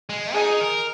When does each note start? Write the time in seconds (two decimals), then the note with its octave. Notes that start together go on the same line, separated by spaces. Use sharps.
0.09 G#3
0.35 D#4 G#4
0.61 A#4